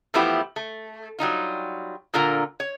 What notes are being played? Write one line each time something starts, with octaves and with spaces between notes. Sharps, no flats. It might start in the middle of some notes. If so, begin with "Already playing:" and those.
E3 F3 A3 B3 E4 G4
A3
F#3 G3 D#4 F4
A#2 D3 F4 A#4 A#5
C#5